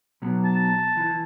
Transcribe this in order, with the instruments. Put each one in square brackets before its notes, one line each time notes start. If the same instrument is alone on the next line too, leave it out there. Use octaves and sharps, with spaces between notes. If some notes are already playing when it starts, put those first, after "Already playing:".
[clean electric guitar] B2 F#3
[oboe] A5
[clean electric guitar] E3